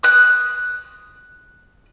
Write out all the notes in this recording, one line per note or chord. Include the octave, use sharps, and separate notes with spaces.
D#6 F#6